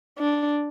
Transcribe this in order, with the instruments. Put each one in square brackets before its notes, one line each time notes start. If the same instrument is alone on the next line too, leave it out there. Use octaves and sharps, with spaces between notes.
[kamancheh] D4